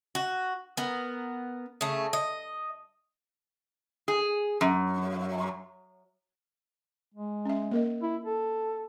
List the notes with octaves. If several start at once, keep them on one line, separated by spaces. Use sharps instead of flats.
F#4
B3 A#4
C#3 A3
D#5
G#4
F#2
G#3
C#4 E5
A#3 A#4 D#5
E4
A4